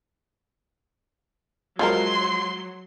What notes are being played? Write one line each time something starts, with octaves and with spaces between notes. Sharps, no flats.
F3 F#3 G#3 A#4 C6